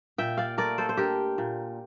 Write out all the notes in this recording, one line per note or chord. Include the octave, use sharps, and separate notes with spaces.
A#2 E5 G5
D5 F5
A3 A#4 D5
A4 C5
C5
D4 G4 A#4
A#2